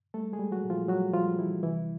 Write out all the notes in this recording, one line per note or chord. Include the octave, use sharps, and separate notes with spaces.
G3 A3 A4
G#3 G#4
G3
F#3 F#4
A#2
F3 F4
F#3 G3 F#4
F3 G3 F4
E3 G3 E4
C3 E3 E4